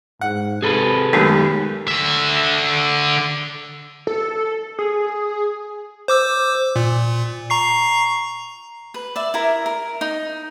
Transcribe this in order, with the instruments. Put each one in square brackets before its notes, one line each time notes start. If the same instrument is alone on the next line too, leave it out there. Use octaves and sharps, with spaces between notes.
[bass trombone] G#2 [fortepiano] F#5
[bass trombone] C3 [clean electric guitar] G#4 A4 B4
[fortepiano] B1 F#2 B2 [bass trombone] D#3 [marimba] G#3 A3 G4
[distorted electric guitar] D3 E5
[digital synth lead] A4
G#4
[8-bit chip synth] C5 D6 E6
A#2
A#5 C#6 C7
[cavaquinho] B4
D5 E5
E4 A#4
A#4
D#4